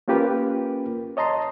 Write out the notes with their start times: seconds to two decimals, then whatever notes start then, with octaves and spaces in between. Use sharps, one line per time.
0.08 A#3 C#4 F4 G4 A#4 B4
1.17 C#5 D#5 A5 A#5 C6